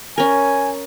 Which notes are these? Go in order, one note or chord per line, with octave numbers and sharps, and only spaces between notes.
C#4 A#4 G#5